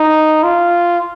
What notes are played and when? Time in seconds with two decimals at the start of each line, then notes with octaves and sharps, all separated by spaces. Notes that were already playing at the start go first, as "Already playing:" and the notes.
Already playing: D#4
0.44 F4